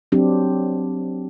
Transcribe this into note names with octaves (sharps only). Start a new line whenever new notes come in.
F#3 C4 D4 G4